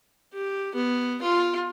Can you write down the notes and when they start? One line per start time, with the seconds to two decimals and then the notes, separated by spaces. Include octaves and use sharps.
0.33 G4
0.75 B3
1.22 F4